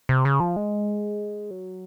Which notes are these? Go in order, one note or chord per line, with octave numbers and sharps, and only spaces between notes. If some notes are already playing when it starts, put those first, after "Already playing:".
C3
C#3
F3
G#3
F#3